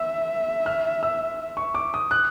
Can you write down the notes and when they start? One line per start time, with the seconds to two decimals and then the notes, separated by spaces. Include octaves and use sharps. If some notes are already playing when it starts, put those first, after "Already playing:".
Already playing: E5 E6
0.66 F6
1.03 E6
1.57 C#6
1.75 D6
1.94 D#6
2.11 F#6